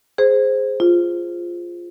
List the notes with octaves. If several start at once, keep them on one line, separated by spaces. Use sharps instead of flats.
G#4 C5
F4